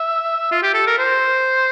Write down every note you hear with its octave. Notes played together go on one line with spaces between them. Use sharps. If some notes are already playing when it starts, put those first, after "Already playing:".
Already playing: E5
F4
G4
A4
A#4
C5